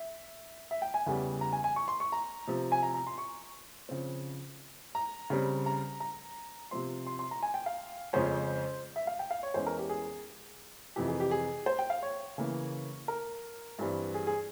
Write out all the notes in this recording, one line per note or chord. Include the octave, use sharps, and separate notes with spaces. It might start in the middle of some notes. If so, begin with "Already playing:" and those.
Already playing: E5
E5
G5
G#5
E2 C#3 E3 G3
A#5
G#5
G#5
C#6
C6
C#6
A#5
C3 F3 C4
G#5
A#5
A#5
C6
C#6
C#3 F3 C4
A#5
C#3 G3 C4
A#5
A#5
C3 F3 C4 C6
C6
C6
A#5
G#5
G5
F5
F2 C#3 F3 G#3 C#4 C5
E5
F5
G5
F5
C#5
E2 E3 G#3 C#4 C5
A#4
G4
G#4
F2 C3 E3 G4
G#4
G4
G#4
C5
G5
F5
C#5
C#3 E3 A#3
A#4
G2 E3 G3 C4
G#4
G#4